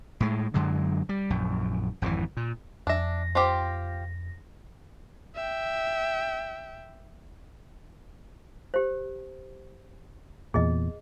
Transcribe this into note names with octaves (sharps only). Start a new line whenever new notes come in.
A2 G#3
F#2 D3 F#3 G#3
G3
A#1 F#2
G#1 F2 C3 E3
A#2
F2 D4 E5 A#6
C4 F4 G4
E5 G5
G4 C5
E2 A#2 G#4 D#5